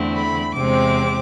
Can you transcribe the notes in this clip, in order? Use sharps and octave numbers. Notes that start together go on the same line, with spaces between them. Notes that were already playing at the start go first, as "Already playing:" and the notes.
Already playing: E2 D3 A3 C4 E4
B5
E2 C3 G#3 C4 D6